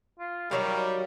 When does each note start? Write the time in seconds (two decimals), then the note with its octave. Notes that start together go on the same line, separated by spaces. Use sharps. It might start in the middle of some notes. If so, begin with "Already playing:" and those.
0.19 F4
0.51 D#3 F#3 G3 A#4 F5